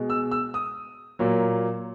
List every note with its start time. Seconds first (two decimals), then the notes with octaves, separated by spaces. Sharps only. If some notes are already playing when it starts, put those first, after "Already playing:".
Already playing: B2 G#3
0.10 E6
0.31 E6
0.54 D#6
1.19 A#2 F#3 A#3